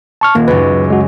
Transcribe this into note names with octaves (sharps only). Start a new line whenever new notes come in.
A5 C#6 F6
D#1 A#3
C#2 F#2 B4
G#3 F#4